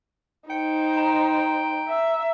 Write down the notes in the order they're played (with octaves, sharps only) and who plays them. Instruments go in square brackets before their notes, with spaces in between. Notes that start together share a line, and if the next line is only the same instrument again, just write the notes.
[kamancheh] D#4 C5 [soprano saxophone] G5 [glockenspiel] C#7
[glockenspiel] A#5 B5 D7
[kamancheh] E5